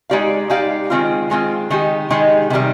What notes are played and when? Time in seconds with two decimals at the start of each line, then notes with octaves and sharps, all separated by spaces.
0.10 G#3 D#4 G4 D5 F5
0.50 G#3 D#4 G4 D5 F5
0.90 D#3 G#3 C4 F4
1.30 D#3 G#3 C4 F4
1.70 D#3 G#3 D#4 G4
2.10 D#3 G#3 D#4 G4
2.50 C3 D#3 G3